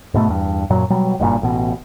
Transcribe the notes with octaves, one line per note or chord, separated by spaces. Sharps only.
G#2 B2 A3
E2 G2
F#2 A#2 F#3
B2 F#3 G3
F#1 G2 A#2
A1 B2